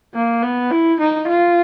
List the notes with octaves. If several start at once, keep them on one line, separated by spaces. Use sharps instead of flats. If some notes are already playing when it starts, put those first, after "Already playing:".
A#3
B3
E4
D#4
F4